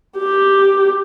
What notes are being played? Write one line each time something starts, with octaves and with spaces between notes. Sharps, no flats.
G4